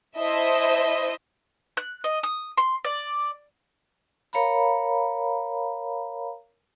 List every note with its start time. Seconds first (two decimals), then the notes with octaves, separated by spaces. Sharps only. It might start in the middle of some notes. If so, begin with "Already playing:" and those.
0.17 E4 C5 D#5 E5 A5
1.77 F#6
2.04 D#5
2.23 D#6
2.57 C6
2.85 D5
4.33 A#4 C#5 F5 A#5 B5